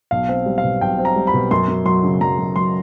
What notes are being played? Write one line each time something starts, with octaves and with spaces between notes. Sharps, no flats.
B1 F5
C4
G3
F5
B2
B1 G5
C4
A#5
G3
B5
B2
F#2 C6
F#2
F#3 C6
C#3
F#2 A#5
F#2
F#3 C6